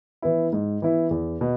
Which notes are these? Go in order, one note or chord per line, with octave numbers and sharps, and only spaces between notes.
E3 B3 E4
G#2
E3 B3 E4
E2
B2